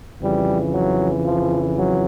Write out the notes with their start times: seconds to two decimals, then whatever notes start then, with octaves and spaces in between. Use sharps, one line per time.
0.22 F2 C#3 E3 G3
0.73 F#3
1.24 F3
1.76 F#3